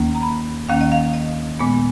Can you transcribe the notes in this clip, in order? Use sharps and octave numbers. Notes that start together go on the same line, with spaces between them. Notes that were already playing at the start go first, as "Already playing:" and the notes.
Already playing: D#2 D#3 A#3 C#4
A#5
B5
D#2 D#3 A#3 C#4 F5
D#5
F5
D#5
A#2 G#3 B3